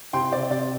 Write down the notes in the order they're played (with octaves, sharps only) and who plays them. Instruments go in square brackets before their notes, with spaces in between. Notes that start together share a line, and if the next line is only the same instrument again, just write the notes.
[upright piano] C3 G5 C6
C4 D5
C3 D5